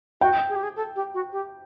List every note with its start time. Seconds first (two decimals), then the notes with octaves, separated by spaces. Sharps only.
0.21 F#4 G5
0.49 G#4
0.56 G4
0.63 G#4
0.76 A4
0.96 G4
1.14 F#4
1.32 G4